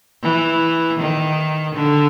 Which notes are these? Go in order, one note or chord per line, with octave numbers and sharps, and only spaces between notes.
E3
D#3
D3